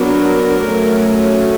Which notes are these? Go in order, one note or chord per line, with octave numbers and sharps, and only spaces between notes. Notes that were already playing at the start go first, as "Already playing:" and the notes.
Already playing: F#3 B3 D4 A#4
F#3 A3 C#4